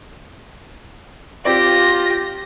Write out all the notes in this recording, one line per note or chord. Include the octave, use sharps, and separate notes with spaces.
C4 F4 G4 D5 A#6